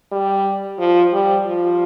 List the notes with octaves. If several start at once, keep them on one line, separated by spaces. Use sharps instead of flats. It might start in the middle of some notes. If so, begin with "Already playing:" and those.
G3
F3
G3
F3